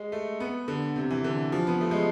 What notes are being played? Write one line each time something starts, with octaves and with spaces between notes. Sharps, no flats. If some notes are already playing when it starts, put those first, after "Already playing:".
Already playing: G#3
A3
B3
D3
C3
E3
D3
F3
B3
A3
G#3